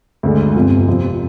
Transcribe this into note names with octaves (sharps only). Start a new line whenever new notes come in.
D2 D3 G#3
G1 F2 C3 F3
F2 C3 F3